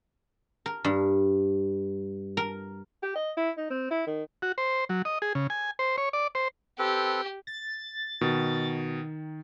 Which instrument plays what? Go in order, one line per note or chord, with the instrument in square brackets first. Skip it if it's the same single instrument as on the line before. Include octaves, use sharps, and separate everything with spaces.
[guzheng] A#4
G2
A#4
[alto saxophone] G4
D#5
E4
D#4
C4
E4
D#3
[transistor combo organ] F#4
C5
F#3
D#5
G#4
C#3
G#5
C5
C#5
D5
C5
[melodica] C4 A4 B4 [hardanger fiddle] G4
[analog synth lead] A6
[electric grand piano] B2 [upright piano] D#3